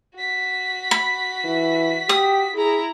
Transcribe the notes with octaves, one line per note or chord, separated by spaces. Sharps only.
F#4 B6
B5
E3
G4 D#6
E4 G#4 A#5